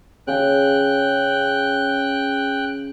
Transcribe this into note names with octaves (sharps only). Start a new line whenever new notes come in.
C#3 G#4 F5 G5 F#6